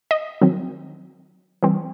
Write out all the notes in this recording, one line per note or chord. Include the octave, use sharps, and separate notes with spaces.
D#5
D#3 F#3 C4
E3 G3 C4